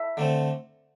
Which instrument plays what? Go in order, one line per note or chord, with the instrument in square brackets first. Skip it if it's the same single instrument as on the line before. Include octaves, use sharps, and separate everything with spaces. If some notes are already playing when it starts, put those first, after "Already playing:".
Already playing: [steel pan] E5
[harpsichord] D3 A3 C4